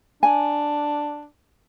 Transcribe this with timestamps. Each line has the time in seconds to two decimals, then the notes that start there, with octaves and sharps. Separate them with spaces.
0.23 D4 G#5